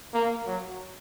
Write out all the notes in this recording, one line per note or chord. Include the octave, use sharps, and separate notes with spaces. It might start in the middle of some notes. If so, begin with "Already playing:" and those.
A#3
F#3